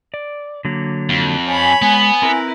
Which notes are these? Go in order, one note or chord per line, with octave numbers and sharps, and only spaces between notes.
D5
D3 F#3 A#3
F2
C#5 G#5 B5
G#3 B3
C4 E4 A#4 B4